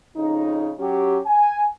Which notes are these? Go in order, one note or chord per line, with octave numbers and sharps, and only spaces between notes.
F2 C#3 D#4
F#3 C#4 G4
G#5